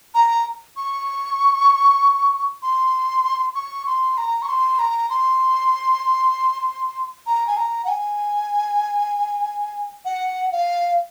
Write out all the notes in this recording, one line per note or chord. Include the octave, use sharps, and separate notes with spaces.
A#5
C#6
C6
C#6
C6
A#5
C#6
C6
A#5
C6
A#5
G#5
A#5
F#5
G#5
F#5
F5